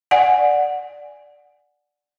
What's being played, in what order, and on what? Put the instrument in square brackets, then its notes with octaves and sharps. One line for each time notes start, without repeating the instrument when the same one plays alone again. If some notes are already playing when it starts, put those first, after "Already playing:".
[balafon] D5 F#5 G#5